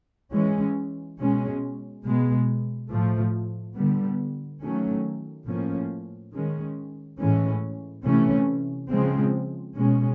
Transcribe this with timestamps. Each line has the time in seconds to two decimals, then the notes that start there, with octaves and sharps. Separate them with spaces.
0.33 E3 G#3 C#4
1.19 B2 G#3 C#4
2.05 B2 G#3 B3
2.90 A2 F3 A3
3.76 D3 G3 B3
4.62 D#3 F#3 A3 C#4
5.47 A2 F3 A#3 C#4
6.33 D#3 G#3 C#4
7.19 A2 E3 G#3 C#4
8.05 C3 E3 A3 C#4
8.90 C#3 F3 G#3 C4
9.75 B2 G#3 C#4